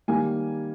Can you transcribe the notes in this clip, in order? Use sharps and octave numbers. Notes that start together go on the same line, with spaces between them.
D#3 G3 A#3 G#5